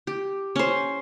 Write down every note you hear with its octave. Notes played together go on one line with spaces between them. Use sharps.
G4
C#4 C5